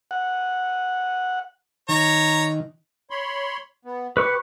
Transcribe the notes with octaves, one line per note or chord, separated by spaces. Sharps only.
F#5
D#3 C#5 A#5
C#5 B5 C6
B3
G4 B4 C#6